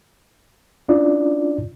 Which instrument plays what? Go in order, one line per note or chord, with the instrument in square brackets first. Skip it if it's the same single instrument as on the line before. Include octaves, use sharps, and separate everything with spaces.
[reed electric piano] C#4 D4 E4 F4 D5